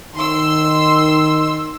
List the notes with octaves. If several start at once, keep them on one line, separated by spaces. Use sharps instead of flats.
D#3 C6 E6